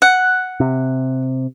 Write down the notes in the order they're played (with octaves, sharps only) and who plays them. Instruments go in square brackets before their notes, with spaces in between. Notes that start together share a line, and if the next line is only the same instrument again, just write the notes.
[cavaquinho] F#5
[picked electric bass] C3